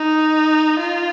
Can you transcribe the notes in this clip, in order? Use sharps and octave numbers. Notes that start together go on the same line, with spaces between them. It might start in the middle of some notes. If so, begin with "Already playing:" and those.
Already playing: D#4
F4